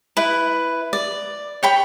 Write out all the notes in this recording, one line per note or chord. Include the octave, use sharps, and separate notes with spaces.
E4 B4
D5
C#5 G5 B5